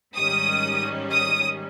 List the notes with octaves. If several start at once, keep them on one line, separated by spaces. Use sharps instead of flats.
G#2 D#3 G3 C#4 D#6
D#6